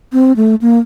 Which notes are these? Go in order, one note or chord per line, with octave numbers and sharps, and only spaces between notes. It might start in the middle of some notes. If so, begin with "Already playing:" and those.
C4
A3
A#3